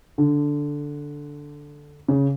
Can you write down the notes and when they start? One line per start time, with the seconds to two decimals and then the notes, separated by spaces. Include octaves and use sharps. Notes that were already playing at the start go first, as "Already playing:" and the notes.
0.18 D3
2.08 C#3